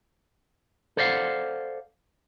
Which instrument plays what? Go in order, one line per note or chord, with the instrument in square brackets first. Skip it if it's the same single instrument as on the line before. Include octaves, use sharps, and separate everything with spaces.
[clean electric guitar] A4 C5 D5 D#5 F5 F#5